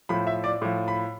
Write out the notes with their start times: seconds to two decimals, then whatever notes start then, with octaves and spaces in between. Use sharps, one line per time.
0.09 A2 F3 B5
0.27 E5
0.44 D5
0.62 A2 F3
0.88 B5